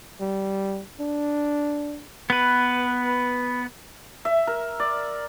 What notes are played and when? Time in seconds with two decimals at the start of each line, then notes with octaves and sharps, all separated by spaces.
0.20 G3
1.00 D4
2.30 B3 B4
4.25 E5
4.47 A#4
4.80 D5